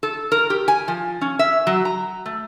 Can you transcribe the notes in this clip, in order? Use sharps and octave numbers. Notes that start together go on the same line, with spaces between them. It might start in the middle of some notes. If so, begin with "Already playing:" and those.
A4
A#4
G4
G#5
F3
C#4
E5
F#3
A#5
A3